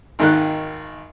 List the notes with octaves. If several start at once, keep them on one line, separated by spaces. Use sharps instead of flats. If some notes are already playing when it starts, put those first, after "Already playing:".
G#1 D#2 D#3 F#6